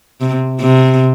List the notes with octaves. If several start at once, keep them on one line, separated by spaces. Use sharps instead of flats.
C3
C3